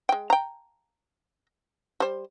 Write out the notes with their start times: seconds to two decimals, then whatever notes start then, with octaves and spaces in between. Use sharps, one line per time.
0.09 G#3 G5
0.30 G5 A#5
2.00 G3 C5